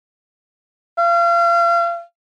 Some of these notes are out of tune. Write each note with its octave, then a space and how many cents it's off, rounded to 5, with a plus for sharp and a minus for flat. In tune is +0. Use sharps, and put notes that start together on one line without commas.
F5 -35